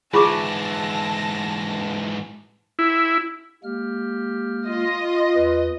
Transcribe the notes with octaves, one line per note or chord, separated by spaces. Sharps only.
G#2 E3 F4 G#4 A5 C#6 D6 A#6
E4
G#3 A#3 G4 F6
F4 D#5
E2 B4